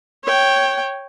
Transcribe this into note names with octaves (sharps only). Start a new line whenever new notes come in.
C#5 G5